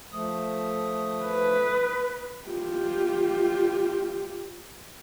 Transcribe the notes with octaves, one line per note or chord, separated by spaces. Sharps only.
F3 A3 D#6
B4
F4 G4